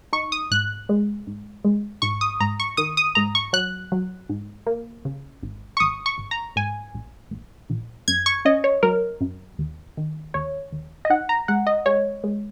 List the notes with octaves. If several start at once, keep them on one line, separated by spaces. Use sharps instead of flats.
D#4 C#6
D#6
G#2 F#6
G#3
G#2
G#3
G#2 C#6
D#6
G#2 A#5
C#6
D#3 D#6
D#6
G#2 A#5
C#6
F#3 F#6
F#3
G#2
A#3
C#3
G#1
C#6
G#1 D#6
C#6
G#1
A#5
G#2 G#5
A#1
A#1
A#1
F#2 G#6
C#6
C#4 D#5
C#5
F#3 A#4
F#2
D#2
D#3
D#2 C#5
D#2
D#5
D#4 F#5
A#5
G#3 F#5
D#5
G#3 C#5
G#3